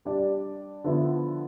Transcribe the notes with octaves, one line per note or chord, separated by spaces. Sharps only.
G3 D4 G4 D5
D3 F3 B3 E4